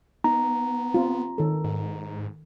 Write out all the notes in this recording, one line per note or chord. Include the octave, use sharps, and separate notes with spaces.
B3 D#4 A#5
C4 F4
D#3 A4
G#2